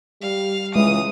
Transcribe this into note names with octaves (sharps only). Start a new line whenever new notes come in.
G3 F5
C#2 E3 G#3 D#6